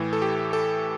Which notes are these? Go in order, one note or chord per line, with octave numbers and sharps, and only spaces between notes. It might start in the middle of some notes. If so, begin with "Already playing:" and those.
Already playing: A2 E3
A4
G4
A4